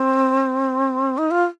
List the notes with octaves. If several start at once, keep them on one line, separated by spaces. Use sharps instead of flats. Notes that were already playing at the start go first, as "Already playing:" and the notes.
Already playing: C4
D#4
F4